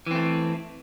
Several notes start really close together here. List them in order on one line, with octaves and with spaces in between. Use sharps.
E3 C4 A3